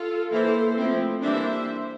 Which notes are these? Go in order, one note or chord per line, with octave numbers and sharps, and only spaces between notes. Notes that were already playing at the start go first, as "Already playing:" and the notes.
Already playing: F4 A4
E3 A#3 E4 A4 C5
F3 A3 C4 E4
E3 G3 A#3 D4 C5 E5